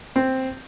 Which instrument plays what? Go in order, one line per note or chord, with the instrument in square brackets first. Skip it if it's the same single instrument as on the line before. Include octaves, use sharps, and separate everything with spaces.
[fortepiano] C4